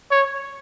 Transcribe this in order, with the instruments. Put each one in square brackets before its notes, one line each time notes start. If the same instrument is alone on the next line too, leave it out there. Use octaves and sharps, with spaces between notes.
[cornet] C#5